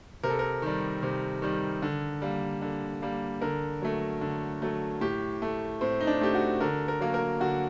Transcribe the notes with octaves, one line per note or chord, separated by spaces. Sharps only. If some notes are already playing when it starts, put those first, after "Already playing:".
C3 A#4
A4
A#4
D#3 G3
C3
D#3 G3
D3
G3 A#3
D3
G3 A#3
D3 A#4
F#3 A3
D3
F#3 A3
A2 G4
A3
A2 C4
D#4
D4
A3 G4
F#4
D3 A#4
A#4
F#3 A#3
A#4
D3 F#4